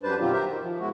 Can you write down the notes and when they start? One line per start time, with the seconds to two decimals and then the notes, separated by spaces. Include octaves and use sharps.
0.03 F#2 G3 D4 B4 C5 A5
0.21 B2 D#3 F#3 C4 F4 G4
0.33 G4 A#4 C5 E5
0.48 D#3
0.61 F3
0.79 B2 G#3 E4 F#4